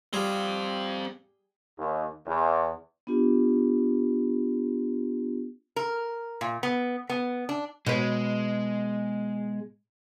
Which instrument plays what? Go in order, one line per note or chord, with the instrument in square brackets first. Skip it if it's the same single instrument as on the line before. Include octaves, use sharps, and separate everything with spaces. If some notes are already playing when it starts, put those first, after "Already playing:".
[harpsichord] G3 G#4 [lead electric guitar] C4 F5
[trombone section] D#2
E2
[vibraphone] B3 D4 F4 G4
[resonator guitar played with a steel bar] A#4
A#2
B3
B3
D4
[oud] B2 B4 [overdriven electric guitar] G#3